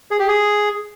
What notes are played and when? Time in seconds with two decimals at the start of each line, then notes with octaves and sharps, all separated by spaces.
0.11 G#4
0.19 G4
0.28 G#4